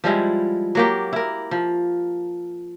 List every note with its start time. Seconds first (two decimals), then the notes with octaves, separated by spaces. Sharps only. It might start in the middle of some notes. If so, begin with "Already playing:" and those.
0.04 F3 G3 G#3 E4
0.75 F#3 A#3 G4
1.13 E4 A#4
1.51 F3